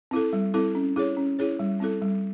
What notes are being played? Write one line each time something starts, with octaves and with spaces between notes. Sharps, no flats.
C4 E4 A4
G3
C4 E4 A4
C#4
E4 G#4 C#5
C#4
E4 G#4 C#5
G3
C4 E4 A4
G3